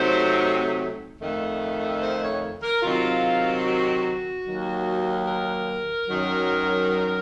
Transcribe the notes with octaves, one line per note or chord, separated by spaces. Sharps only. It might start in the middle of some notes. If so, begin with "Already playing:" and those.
Already playing: C3 F#3 A3 C4 D#4 C5
F2 D#3 A3
C5
C#5
A#4
C3 D#3 F#3 C4 F4
F#4
D#2 D#3 F#3
A#4
F#2 D#3 F#3